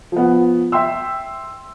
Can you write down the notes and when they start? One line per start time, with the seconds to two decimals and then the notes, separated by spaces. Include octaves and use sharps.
0.12 F3 B3
0.72 E5 G5 C6 E6